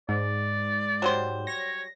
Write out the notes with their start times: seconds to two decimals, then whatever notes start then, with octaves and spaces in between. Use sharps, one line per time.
0.09 G#2 D5
1.02 F#3 G3 C5
1.47 C#5 A#6